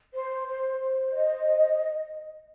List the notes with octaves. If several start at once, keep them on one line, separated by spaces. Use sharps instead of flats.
C5
C5
C5
D#5